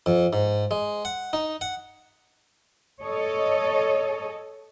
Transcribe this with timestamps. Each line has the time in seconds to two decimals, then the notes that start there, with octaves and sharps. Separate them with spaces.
0.06 F2
0.33 G#2
0.71 G#3
1.05 F#5
1.33 D#4
1.61 F#5
3.02 A4 C#5 D#5